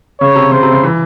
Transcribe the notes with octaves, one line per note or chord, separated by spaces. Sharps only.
C#3 C#5
C3
C#3 C5
C3
C#3
E3